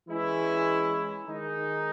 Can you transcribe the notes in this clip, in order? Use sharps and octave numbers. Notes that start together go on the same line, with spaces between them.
E3 G#3 C#4 E4
D#3 G#3 D#4